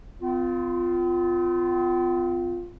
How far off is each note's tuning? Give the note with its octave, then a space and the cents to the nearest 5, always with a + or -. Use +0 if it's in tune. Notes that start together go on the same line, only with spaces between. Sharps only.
C4 -45 F4 +0